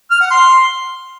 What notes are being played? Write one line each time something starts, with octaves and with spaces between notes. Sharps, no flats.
F6
F#5
C6